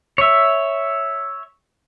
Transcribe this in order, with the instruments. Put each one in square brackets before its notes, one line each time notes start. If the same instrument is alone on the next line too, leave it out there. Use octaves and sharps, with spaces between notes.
[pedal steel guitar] C#5 E5